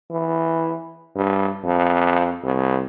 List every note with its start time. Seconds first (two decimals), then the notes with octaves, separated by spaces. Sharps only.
0.11 E3
1.16 G2
1.64 F2
2.43 C2